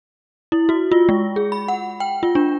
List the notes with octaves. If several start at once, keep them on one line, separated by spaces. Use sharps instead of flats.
E4
F#4
F4
G#3
G#4
B5
F#5
G5
F4
D4